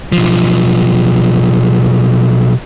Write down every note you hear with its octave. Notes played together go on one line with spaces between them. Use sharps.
B1 F3